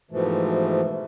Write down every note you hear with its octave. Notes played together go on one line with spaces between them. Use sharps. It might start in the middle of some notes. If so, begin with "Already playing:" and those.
G#2 B2 E3 F3 A3